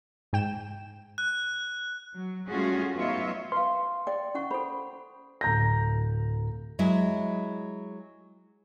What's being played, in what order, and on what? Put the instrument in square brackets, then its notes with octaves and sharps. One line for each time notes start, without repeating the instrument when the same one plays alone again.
[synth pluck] G#2 G5 E7
[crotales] F#6
[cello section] F#3
G3 A3 C#4 F4 F#4 G#4
F#3 B3 D#4 F4 C#5 E5
[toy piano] B4 F5 [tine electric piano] C6
[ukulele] D5 [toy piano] G5
[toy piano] C#4 F#5 C#6
[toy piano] A4 B5 [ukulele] C5
[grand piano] D1 A#5 G6 A#6
[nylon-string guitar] F#3 G#3 E4